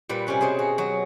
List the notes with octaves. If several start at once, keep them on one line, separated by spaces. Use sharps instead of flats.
A#2 G3 B4
C3 G3 C#4 B4
B2 C4 G#4
F#4
F#3 F#4